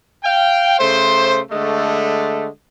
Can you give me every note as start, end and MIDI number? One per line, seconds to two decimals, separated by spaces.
0.24 0.77 77
0.24 0.77 79
0.79 1.39 49
0.79 1.39 57
0.79 1.39 72
1.50 2.47 50
1.50 2.47 56
1.50 2.47 57